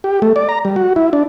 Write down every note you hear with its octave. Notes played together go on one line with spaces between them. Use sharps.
G4
A3
D5
A#5
G3
F#4
E4
D4